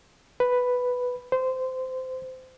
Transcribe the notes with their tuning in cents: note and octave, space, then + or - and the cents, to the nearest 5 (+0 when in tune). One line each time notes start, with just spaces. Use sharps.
B4 +5
C5 -20